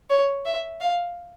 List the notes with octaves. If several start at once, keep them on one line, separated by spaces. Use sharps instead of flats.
C#5
E5
F5